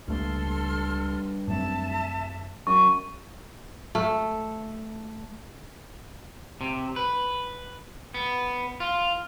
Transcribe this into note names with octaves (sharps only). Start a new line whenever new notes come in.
C#2 G2 A3 A#3 A4 C6 F6
F#2 A3 C4 E5 A5
F#2 C#6
A3
C3
B4
B3
F4